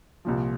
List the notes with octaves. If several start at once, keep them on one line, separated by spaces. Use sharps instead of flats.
C2 A#2 F3